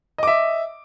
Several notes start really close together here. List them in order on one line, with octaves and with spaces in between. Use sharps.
D#5 D6 E5